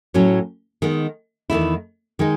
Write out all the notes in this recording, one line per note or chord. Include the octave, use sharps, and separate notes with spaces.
A2 F#3 C#4
D#3 G#3 B3
E2 D#3 A3 E4
D#3 G#3 D#4